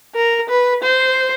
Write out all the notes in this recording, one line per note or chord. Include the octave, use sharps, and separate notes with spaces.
A#4
B4
C5